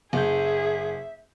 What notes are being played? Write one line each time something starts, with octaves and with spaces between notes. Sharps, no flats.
F#1 G#4 E5 G6